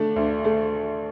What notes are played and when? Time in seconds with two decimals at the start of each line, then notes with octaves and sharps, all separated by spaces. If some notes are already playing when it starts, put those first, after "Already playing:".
Already playing: A3 D4
0.16 D2
0.45 A3